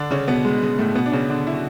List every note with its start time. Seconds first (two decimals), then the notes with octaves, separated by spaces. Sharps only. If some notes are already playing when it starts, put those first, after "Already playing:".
Already playing: D3 D4
0.11 C#3 C#4
0.28 B2 B3
0.45 G#3
0.62 G#3
0.78 A2 A3
0.95 B2 B3
1.06 D4
1.12 C#3 C#4
1.29 D3 D4
1.47 E4
1.54 F#4